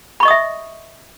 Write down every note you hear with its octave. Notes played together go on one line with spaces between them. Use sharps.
D#5 E5 B5 C#6 D#6